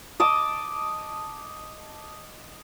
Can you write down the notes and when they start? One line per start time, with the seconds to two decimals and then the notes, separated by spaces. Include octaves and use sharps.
0.20 D#5 A5 D6 E6